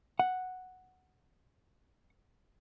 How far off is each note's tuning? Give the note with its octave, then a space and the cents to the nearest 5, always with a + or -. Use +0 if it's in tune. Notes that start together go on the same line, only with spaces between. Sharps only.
F#5 +0